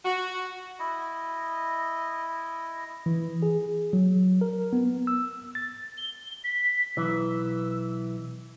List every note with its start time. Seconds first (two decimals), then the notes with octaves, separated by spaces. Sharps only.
0.04 F#4
0.79 E4 D#5
3.06 E3
3.43 G#4
3.93 F#3
4.41 A#4
4.73 B3
5.07 E6
5.55 A6
5.97 G7
6.44 B6
6.97 B1 E3 E6